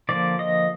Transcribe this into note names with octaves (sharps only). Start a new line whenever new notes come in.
D3 F3 A#3 D5
D#5